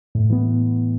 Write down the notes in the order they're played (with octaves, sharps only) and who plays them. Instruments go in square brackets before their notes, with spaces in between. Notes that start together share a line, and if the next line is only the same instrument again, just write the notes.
[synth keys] A2
E3 B3